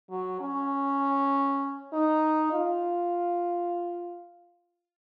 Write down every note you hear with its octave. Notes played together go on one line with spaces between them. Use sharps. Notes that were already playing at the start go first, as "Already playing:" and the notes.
F#3
C#4
D#4
F4